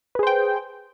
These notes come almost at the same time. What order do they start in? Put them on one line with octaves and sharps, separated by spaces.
B4 G#4 C5 G5